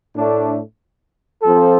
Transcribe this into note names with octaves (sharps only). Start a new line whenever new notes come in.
A2 A3 D4
F3 C4 F4 A4